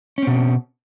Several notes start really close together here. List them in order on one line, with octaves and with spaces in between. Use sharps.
C#4 C4 B2